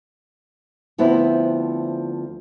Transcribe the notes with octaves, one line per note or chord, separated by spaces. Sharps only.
D2 F3 B3 C4 E4